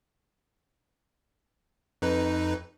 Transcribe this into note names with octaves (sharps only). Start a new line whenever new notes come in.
F2 D#4 B4